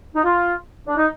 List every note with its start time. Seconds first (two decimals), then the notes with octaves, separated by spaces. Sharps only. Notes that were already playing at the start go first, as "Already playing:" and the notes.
0.16 D#4
0.24 F4
0.88 D4
0.97 D#4